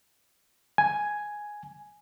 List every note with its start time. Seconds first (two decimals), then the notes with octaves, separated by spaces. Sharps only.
0.78 G#5